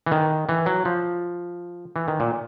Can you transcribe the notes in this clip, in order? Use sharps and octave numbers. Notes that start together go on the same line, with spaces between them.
E3
D#3
E3
F#3
F3
E3
D#3
A#2